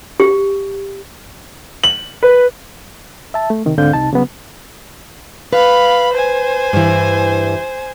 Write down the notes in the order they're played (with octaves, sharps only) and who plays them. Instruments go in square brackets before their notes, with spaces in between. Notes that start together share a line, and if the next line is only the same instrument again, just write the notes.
[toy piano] G4
[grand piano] F#7
B4
[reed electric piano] E5 A5
A3
C3 D#3
D2 G#2 D3 C4 F5 G6
C2 C3 D#4 A5
C#3 F#3 G3 B3
[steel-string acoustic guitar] B4 [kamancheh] F5 B5
[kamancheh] C5 G#5
[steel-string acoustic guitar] G2 E3